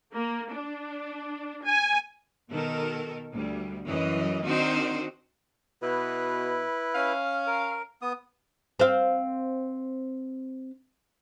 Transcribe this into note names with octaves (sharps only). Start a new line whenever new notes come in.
A#3
D4
G#5
B2 D#3 A4 A#4
D2 G3
F#2 E3 D#5
D#3 C4 D4 D#4 F#4 C5
B2 E4 B4
C#4 F5
A#4
B3 D#6
C4 F5